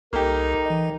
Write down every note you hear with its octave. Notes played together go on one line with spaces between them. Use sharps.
C2 A#3 D#4 G4 A4 A#4
E3 D#5